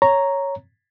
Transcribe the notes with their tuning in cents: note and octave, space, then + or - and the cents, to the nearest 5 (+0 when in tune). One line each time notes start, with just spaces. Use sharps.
C#5 +0 A#5 +0